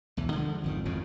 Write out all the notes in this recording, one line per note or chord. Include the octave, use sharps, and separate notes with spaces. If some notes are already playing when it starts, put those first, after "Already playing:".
B1 E2 E3
D3 F3 G3 G#3
G#1 F2 D#3
G#1 F2 A2 C#3